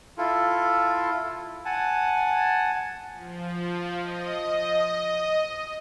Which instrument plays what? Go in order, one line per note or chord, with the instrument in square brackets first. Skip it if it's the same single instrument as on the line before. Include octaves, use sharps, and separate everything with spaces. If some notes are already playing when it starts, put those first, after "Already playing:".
[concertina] E4 F4 A4
F#5 G#5 A5
[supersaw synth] F3
D#5